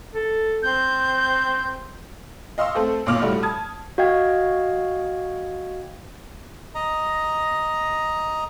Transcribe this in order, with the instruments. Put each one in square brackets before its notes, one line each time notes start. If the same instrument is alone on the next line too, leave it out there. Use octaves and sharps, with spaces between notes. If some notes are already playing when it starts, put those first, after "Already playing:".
[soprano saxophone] A4
[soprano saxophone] C4 [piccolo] G6
[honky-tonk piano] D#5 F5 C6 C#6 E6
A3 C4 A4 C5
B1 A#2 F5 D6 F6 F7
A2 G3 A3 F#4
A5 D#6 G#6
[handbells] F#4 D#5 F5 G5 G#6
[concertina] D#5 A#5